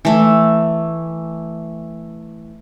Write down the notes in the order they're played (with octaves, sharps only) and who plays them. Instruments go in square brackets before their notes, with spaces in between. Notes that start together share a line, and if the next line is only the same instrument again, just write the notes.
[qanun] E3 A3